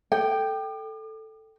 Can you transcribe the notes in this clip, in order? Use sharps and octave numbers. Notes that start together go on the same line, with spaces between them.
A4 G5